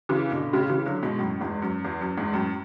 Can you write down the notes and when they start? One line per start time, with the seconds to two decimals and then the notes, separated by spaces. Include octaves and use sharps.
0.09 C#3 E3
0.31 B2 D3
0.53 A2 C#3
0.69 C#3 E3
0.86 D3 F#3
1.03 G#2 B2
1.19 F#2 A2
1.40 E2 G#2
1.62 F#2
1.84 E2
2.01 F#2
2.17 E2 G#2
2.34 F#2 A2